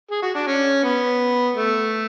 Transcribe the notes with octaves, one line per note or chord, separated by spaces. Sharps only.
G#4
F#4
D4
C#4
B3
A3